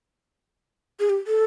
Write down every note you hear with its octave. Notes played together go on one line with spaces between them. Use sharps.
G#4
G4
A4